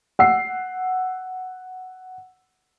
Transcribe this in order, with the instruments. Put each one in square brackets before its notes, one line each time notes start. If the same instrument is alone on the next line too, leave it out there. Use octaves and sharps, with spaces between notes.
[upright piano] F#5 E6 C7